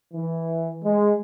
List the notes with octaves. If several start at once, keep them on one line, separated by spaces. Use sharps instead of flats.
E3
G#3